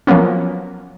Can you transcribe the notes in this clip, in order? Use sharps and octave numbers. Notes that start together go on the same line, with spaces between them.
F3 F#3 A#3 B3 C#4